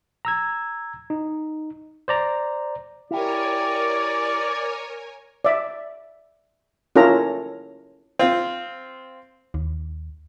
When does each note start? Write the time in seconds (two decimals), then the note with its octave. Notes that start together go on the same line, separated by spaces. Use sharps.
0.25 A#5 E6 G#6
1.10 D#4
2.08 C5 D5 A#5
3.11 E4 G4 A#4 C#5 D5 G#5
5.45 D5 E5
6.96 C#4 E4 F4 A4 A#4 A#5
8.19 C4 F4
9.54 D#2